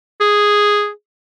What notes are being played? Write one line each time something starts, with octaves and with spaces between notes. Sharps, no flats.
G#4